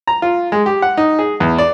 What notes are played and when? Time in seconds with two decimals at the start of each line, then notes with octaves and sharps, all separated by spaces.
0.07 A#5
0.22 F4
0.52 G#3
0.66 G4
0.82 F#5
0.97 D#4
1.19 G#4
1.40 E2
1.59 D5